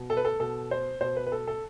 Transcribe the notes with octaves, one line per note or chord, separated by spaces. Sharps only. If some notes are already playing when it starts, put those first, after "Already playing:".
Already playing: B2
A4
B4
A4
B2 A4
C5
B2 C5
B4
B4
A4
A4